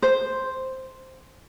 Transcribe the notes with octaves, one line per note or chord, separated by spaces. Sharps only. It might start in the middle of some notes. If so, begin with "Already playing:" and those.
C5